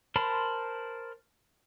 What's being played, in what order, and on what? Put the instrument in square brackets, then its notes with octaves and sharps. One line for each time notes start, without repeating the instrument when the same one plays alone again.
[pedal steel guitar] A#4 C5 A5 B5 C6